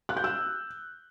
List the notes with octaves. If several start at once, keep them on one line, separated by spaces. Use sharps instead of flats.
F#6
G6
E6